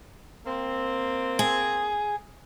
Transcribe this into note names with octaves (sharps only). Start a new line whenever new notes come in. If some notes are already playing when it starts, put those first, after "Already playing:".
A#3 C4
G#4